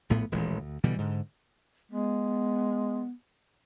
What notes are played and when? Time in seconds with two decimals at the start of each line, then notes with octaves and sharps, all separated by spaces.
0.10 A#1 A2 A3 B3
0.32 D#1 A1 E3 G#3
0.59 D2
0.84 B2 D3 E3 G3
0.98 G#2 D3
1.91 G#3 B3